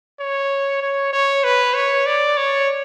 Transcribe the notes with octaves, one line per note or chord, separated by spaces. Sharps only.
C#5
C#5
C#5
B4
C#5
D5
C#5